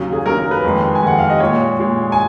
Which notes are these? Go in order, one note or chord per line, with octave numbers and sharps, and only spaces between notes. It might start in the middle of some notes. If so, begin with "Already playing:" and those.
Already playing: D#2 C#3 F#3
G#4
D#2 C#3 F#3 A#4
A#4
B4
F2 D#3 G#3
G#5
F2 D#3 G#3 F#5
F5
D#5
A#2 G#3 C#5
A#2 G#3
G#5